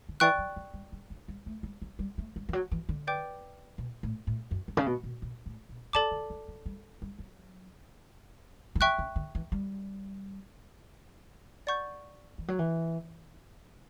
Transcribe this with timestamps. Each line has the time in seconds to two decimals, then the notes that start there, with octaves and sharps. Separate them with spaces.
0.09 D3
0.20 E3 D5 G5 C#6 F#6
0.38 F#3
0.56 F#3
0.74 G3
0.92 G3
1.10 F#3
1.28 G3
1.46 A3
1.63 G3
1.82 F#3
1.99 G3
2.18 A3
2.36 G3
2.49 E3
2.53 F#3
2.72 E3
2.89 D3
3.07 B4 D5 G5 D6 G6
3.78 B2
4.03 A2
4.27 A2
4.51 F#2
4.68 G2
4.77 C#3
4.86 B2
5.04 B2
5.22 B2
5.46 A2
5.69 B2
5.93 C#3 A4 D5 A5 D6
6.11 D3
6.30 F#3
6.48 F#3
6.66 G3
7.02 G3
7.19 F#3
8.75 D3
8.80 E3 E5 G5 C#6 F#6
8.99 C#3
9.16 D3
9.35 E3
9.52 G3
11.67 D5 F#5 C#6 G6
12.38 E3
12.48 F#3
12.59 E3